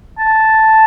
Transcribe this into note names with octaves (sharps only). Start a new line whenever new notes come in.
A5